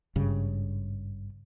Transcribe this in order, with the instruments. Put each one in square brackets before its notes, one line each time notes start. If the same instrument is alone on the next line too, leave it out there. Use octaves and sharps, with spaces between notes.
[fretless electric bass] G#1 G2 C#3